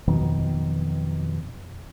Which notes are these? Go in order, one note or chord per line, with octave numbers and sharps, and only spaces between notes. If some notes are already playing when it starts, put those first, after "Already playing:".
F2 B2 D#3 F#3